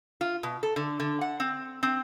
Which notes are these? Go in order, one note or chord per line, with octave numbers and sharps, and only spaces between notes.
F4
B2
A4
D3
D3
F#5
C4
C4